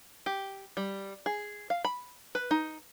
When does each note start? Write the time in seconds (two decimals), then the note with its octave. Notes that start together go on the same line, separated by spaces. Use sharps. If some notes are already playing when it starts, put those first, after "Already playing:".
0.26 G4
0.77 G3
1.26 G#4
1.70 F5
1.85 B5
2.35 B4
2.51 D#4